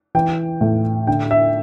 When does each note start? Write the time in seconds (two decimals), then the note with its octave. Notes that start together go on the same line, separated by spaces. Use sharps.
0.15 E3 G5
0.61 A2
1.07 D3 G5
1.31 E5